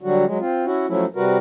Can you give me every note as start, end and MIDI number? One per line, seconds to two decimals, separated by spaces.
0.01 0.25 50
0.01 0.25 54
0.01 0.25 55
0.01 0.25 66
0.26 0.38 54
0.26 0.38 56
0.40 0.65 60
0.40 0.65 65
0.65 0.86 61
0.65 0.86 64
0.65 0.86 66
0.88 1.05 53
0.88 1.05 54
0.88 1.05 57
0.88 1.05 61
0.88 1.05 64
1.16 1.38 48
1.16 1.38 55
1.16 1.38 66
1.16 1.38 70
1.16 1.38 71